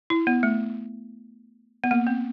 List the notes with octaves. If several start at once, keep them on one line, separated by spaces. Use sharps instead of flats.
E4
B3
A3
B3
A#3
C4